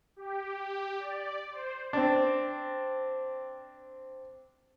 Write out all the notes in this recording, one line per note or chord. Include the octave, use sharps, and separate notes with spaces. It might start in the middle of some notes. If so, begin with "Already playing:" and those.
G4
G4
D5
C5
C4 D4